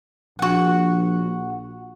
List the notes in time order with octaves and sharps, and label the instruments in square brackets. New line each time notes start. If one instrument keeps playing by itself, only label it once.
[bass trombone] A#1 [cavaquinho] F#4 F#5